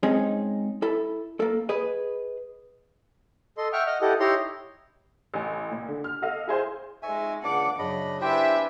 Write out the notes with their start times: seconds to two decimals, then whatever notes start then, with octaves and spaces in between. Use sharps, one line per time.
0.03 G#3 C4 C#4 D#4 G#4 C#5
0.82 E4 A4
1.40 A#3 A4
1.69 G#4 B4 D#5
3.57 A4 D#5 C6
3.73 E5 F#5 G5 C#6 F6
3.86 D#5 F#5 F6
4.02 E4 G4 A4 D#5 F#5
4.20 D#4 E4 G4 C#5 A#5 C6
5.34 A1 G#5
5.71 A#2
5.88 D3
6.04 F6
6.22 A4 D#5 F5 F6
6.47 E4 G#4 C5 G#5
7.03 F2 G#3 D#4 E5 G#5 C#6
7.43 C#2 C#3 A#3 D4 F#5 D6
7.79 F#2 C#3 D4 D#5 B5
8.21 D4 E4 G4 B4 C5 E5 G5 G#5